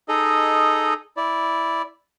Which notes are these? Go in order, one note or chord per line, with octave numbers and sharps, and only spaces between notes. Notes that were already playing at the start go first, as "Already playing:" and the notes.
D#4 G#4 A4 D#5
E4 D5